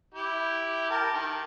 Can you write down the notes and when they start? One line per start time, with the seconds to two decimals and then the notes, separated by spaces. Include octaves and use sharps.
0.14 E4 G4
0.90 A#4 G5 A5
1.14 D#3